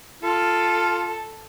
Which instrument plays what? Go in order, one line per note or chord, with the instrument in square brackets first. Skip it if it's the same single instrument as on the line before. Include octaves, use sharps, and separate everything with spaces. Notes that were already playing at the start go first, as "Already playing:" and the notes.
[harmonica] F4 [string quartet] A4